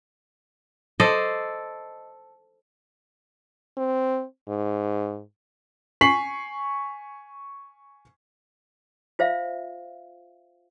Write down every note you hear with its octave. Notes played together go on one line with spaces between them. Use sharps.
A4 C5 D5 D#5
C4
G#2
G#5 C#6 B6 C7 F#7
F4 C5 E5 F5